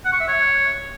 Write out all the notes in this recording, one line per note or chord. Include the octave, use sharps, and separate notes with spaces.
F#5
C#6
E5
C#5